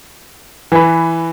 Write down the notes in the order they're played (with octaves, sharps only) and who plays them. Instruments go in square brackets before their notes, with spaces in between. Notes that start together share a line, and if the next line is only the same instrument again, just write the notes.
[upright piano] E3 B4